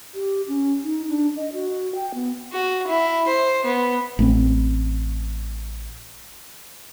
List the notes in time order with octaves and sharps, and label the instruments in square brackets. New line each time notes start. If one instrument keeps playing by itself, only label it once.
[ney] G4
C#4
D#4
D4
D#5
F#4
G5
B3
[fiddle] F#4
E4
C5
B3
[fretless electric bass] A1 A3 C4